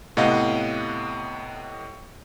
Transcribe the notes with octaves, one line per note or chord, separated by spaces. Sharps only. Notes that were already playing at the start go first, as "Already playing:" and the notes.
A2 C3 B3 D#5 F5 F#5